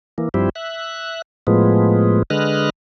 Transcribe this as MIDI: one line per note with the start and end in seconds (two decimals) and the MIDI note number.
0.18 0.29 52
0.18 0.29 58
0.34 0.49 43
0.34 0.49 53
0.34 0.49 55
0.34 0.49 60
0.34 0.49 64
0.34 0.49 67
0.56 1.22 76
0.56 1.22 90
1.47 2.23 45
1.47 2.23 53
1.47 2.23 56
1.47 2.23 59
2.30 2.70 50
2.30 2.70 56
2.30 2.70 71
2.30 2.70 75
2.30 2.70 89
2.30 2.70 90